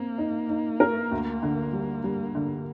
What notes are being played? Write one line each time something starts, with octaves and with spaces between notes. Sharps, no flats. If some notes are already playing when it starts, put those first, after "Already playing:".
Already playing: A#3 C4
D#4
D#4
A#4
D2
D3
G3
G3
D3